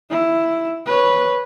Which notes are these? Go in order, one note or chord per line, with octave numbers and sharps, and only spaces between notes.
E4
B4 C#5